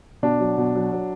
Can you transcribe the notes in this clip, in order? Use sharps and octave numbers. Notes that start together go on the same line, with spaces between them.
B2 D4
F#3
B2
F#3
F#3